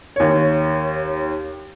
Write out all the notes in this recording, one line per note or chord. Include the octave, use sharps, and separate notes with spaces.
D#2 C#5